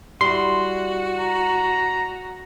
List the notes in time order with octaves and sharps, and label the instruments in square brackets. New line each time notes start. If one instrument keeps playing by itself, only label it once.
[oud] G3 E4 [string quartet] F#4 [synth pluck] C6
[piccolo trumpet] A#5